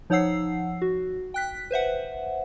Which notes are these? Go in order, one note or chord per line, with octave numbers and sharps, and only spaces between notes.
F3 D#4 C#5 F#5 E6 C7
F#4
G5 F#6 B6
B4 C5 E5 F#5